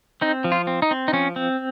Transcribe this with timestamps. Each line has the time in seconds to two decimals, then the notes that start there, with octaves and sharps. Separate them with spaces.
0.21 C4 D#4
0.44 F3
0.52 F4
0.67 C4
0.82 D#4
0.91 C4
1.08 D#4
1.13 F3 C#4
1.36 C4